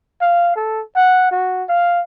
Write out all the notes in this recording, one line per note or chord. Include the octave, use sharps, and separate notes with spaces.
F5
A4
F#5
F#4
F5